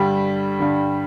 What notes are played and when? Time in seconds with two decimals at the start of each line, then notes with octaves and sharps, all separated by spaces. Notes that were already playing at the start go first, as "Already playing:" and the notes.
Already playing: G2 D3 G3 G4
0.59 G2 D3